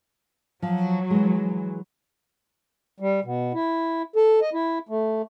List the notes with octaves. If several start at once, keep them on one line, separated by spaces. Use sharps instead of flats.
F3 F#3
E3 G#3
G3
B2
E4
A4
D#5
E4
A3